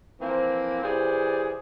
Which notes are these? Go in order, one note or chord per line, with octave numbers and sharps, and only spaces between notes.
E3 F3 A#3 C4
E3 G4 G#4 C5 D5